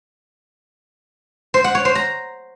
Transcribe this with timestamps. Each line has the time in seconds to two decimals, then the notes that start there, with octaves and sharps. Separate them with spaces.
1.54 C5
1.64 F#5
1.75 C#5
1.85 C5
1.95 A#5